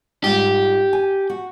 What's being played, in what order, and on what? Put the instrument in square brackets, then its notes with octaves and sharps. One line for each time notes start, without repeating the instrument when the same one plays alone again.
[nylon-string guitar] G#2 G3 F4 [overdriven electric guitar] G4
[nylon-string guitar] G#5
F#4